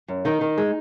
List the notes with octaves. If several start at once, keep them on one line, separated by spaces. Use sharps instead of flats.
F#2
D#3 D#4
D#3
G#3